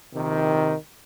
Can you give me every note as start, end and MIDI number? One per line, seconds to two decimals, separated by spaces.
0.13 0.75 34
0.13 0.75 48
0.13 0.75 51